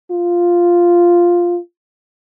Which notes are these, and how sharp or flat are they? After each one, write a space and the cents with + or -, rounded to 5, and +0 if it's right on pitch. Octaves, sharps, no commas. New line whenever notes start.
F4 +0